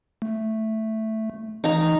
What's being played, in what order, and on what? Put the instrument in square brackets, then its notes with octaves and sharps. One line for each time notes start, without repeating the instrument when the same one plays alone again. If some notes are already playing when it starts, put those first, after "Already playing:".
[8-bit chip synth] A3
[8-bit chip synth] E3 [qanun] D#4 A#5